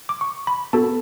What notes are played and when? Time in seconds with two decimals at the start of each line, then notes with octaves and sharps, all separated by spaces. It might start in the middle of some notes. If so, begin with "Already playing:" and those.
0.09 D6
0.21 C#6
0.47 B5
0.73 B3 F#4 A4 A5